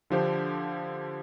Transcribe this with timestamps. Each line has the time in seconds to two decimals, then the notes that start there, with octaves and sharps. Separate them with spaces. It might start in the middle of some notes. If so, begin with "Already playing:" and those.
0.10 D3 F3 D4 G4 C5